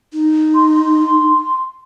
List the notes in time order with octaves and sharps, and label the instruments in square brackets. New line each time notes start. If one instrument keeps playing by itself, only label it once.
[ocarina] D#4
[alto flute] C6